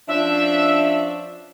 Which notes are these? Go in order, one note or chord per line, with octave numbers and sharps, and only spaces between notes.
F3 C#4 D4 E5